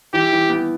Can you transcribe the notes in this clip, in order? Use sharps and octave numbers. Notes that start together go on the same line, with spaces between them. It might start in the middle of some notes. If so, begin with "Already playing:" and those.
E3 G4
E3
B3